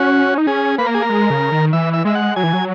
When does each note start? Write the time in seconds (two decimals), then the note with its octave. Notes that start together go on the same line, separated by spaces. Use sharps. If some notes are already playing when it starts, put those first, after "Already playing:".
Already playing: C#4 F#4
0.38 D#4
0.47 C#4 G#4
0.78 A#3 B4
0.86 A#4
0.94 G#4
1.02 A#4
1.09 G#3
1.30 C#3
1.52 D#3
1.73 E3 E5
1.93 E5
2.05 G#3 E5
2.15 F#5
2.36 F#3 G#5
2.43 E3
2.53 F#3